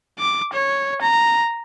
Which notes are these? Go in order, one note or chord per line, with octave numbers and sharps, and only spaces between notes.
D6
C#5
A#5